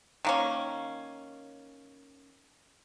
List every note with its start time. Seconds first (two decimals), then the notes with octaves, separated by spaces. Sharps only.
0.25 D#3 A#3 C#4